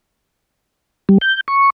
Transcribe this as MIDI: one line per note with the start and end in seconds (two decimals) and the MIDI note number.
1.09 1.18 55
1.21 1.41 91
1.48 1.70 85